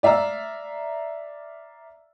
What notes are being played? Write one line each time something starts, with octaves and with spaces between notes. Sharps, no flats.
D5 E5 F5 A#5 E6